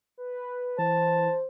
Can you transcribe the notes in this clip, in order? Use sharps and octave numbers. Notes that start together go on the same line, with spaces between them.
B4
E3 C5 A5